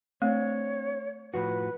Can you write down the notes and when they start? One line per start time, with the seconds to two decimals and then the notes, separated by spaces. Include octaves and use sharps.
0.22 A3 C4 D4 C#5
1.34 A2 F3 F#4 B4